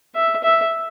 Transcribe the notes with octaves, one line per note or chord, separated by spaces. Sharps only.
E5
E5